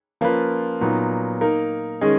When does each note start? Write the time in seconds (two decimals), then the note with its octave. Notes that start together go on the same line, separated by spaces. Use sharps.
0.21 F3 A#3 C#4 F4 B4
0.81 A#2 F#3 B3 D#4
1.41 A#3 D#4 A#4
2.01 D#3 G#3 C#4 G#4 D#5